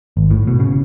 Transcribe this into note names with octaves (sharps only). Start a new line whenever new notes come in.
G#1
A2
B2
C#3